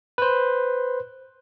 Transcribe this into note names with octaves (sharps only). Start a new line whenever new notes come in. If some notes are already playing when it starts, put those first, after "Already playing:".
B4 C5